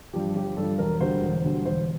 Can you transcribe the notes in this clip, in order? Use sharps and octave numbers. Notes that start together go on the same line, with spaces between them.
G2 F3 G4
G1 G4
G2 F3 A4
E1 A#4
D2 D3 G3 C5
E1
D2 D3 G3
E1 C5